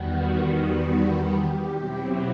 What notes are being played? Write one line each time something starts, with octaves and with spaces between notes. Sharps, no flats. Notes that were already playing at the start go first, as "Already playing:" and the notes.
Already playing: E2 D#3 G3 B3 F#4
G4
B2 F#3 C4 E4